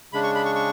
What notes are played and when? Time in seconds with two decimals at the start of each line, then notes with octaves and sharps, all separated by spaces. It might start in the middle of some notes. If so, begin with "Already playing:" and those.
0.13 C#3 G#3 D4 B5
0.23 C#6
0.35 B5
0.45 C#6
0.55 C#6